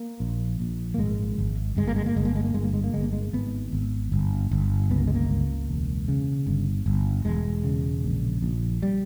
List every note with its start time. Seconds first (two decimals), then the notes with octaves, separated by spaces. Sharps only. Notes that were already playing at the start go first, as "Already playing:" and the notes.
Already playing: A#3
0.20 A#1
0.60 A#1
0.94 A#3
0.98 G#1 G#3
1.39 G#1
1.77 G1 G#3
1.87 A#3
1.96 G#3
2.06 A#3
2.16 G1 G#3
2.25 A#3
2.36 G#3
2.45 A#3
2.54 G1 G#3
2.65 A#3
2.74 G#3
2.84 A#3
2.94 G1 G#3
3.03 A#3
3.13 G#3
3.33 G#1 B3
3.73 G#1
4.12 G1
4.51 G1
4.90 C#2 B3
4.98 A#3
5.07 G#3
5.15 A#3
5.30 C#2
5.68 E1
6.08 C#3
6.47 G1
6.86 G1
7.25 E1 G#3
7.64 C#3
8.04 A#1
8.42 A#1
8.83 G3